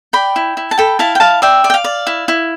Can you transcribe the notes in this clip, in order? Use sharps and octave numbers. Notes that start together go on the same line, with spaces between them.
D5 G5 B5
E4
E4
A5
A4 G5 B5
E4 F5 A5
G5
E4 F5 A5
D5 E5 G5
D5
G5
F5
D5
E4
E4